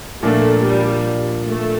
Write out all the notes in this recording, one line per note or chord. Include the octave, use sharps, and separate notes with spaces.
A#2 F3 A3 A#3 D4
G3
A3